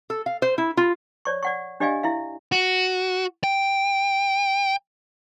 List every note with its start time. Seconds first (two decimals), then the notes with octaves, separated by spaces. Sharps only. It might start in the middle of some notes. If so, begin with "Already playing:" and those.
0.10 A4
0.26 F5
0.42 C5
0.58 E4
0.77 F4
1.25 C#5 D5 C#6
1.43 D5 F#5 C#6
1.80 D4 G4 D5 D#5 F5 G#5
2.03 E4 E5 F5
2.52 F#4
3.44 G5